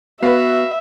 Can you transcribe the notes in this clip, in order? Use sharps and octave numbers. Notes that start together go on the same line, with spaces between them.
B3 F#4 B4 E5 F5